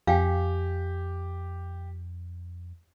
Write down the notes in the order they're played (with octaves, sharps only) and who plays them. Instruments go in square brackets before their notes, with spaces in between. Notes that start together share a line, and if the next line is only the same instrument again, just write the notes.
[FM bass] F2 [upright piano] G4 [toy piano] F5 G5 G#5